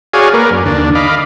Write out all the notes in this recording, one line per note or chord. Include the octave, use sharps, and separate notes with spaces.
F#4 G#4 C#5 D5 F5 G#5
A#3 A#4 B4 D5
F#2
D#2 D3 D4
D#5 F5 B5 D6